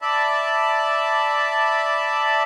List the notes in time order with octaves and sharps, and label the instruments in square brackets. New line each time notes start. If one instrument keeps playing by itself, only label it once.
[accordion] D5 E5 A5 B5